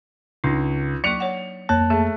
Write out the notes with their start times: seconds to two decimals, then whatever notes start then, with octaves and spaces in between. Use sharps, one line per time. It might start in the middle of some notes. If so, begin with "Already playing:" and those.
0.44 C#2 D4 D#4
1.04 F#3 A#3 C#6 C#7 F7
1.20 C#5 F#5
1.69 F2 A#3 C#5 A5 F#6
1.90 A3 G#4